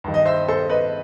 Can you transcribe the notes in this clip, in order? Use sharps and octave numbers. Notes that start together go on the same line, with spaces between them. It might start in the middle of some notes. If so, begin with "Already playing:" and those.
G2 D#3
D#5
C5 E5
A4 C5
B4 D#5